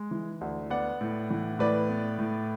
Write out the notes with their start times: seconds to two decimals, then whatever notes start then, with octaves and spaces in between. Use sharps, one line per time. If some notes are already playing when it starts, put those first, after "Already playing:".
Already playing: G#3
0.11 E3
0.41 D2
0.70 B3 D5 F#5
1.01 A2
1.30 E3
1.59 A2 B4 D5
1.89 B3
2.19 A2